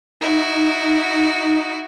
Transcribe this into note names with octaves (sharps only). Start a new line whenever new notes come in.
D#4 E4 F#4